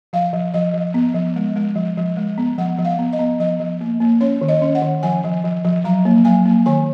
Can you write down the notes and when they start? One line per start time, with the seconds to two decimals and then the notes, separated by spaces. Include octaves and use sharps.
0.13 F3 F5
0.33 F3
0.54 F3 D#5
0.74 F3
0.94 B3
1.14 F3
1.36 G#3
1.56 G#3
1.76 F3
1.97 F3
2.17 G#3
2.38 B3
2.58 F3 F#5
2.78 F3
2.85 F5
2.99 B3
3.13 D#5
3.19 B3
3.40 F3 D#5
3.60 F3
3.81 A#3
4.00 A#3
4.21 C#4 C#5
4.41 D#3
4.49 D#5
4.62 C#4
4.75 F#5
4.82 D#3
5.03 F3 G#5
5.24 F3
5.44 F3
5.65 F3
5.84 F#3 A#5
6.05 A#3
6.25 F#3 G#5
6.46 A#3
6.66 D#3 G#5